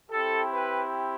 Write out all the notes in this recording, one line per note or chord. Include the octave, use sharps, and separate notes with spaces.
C4 E4 G4 A4
B4